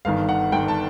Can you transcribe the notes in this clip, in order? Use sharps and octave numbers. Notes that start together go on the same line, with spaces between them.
G1 G2 D#3 F5
F#5
G1 G2 D#3 G5
A5